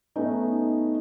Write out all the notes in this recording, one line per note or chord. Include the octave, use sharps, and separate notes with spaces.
A3 B3 C#4 D#4